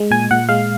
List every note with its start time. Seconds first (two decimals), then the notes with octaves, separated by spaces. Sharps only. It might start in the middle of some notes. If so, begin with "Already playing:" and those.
Already playing: G#3
0.11 A#2 G#5
0.31 A#2 F#5
0.49 G#3 F5